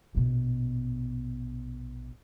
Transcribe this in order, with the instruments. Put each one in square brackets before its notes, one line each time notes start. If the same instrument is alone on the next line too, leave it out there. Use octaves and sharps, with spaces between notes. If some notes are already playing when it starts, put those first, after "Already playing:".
[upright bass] A#1 B2